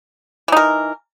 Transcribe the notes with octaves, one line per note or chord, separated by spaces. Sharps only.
E3 D#4 A#4